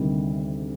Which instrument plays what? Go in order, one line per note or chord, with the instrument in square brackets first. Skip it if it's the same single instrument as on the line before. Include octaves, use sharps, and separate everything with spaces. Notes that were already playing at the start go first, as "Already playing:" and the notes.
Already playing: [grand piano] D2 C3 D#3 G3